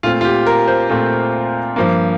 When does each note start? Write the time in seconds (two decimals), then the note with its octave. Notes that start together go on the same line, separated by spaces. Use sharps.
0.03 A#2 A3 C4 F4
0.21 F4
0.25 G4
0.47 A#4
0.68 C5
0.90 A#2 A3 C4
1.76 G2 F3 A#3